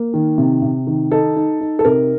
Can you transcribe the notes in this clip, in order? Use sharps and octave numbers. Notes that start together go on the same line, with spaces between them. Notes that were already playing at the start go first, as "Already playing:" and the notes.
Already playing: A#3
D#3
C3
C3
D#3
D#4 A4
D#4
D#4
A4
C3 A#4